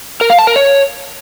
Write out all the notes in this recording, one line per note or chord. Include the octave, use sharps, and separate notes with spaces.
A#4
F5
A5
A#4
C#5